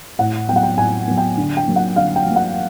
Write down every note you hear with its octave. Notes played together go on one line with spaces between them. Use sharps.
A2 F#5
F#3 B3 F#5 G5
G5
A2 G#5
F#3 B3
G5
D3
G5
F#3 A#3
F#5
D3 F5
G5
F#3 A#3
F#5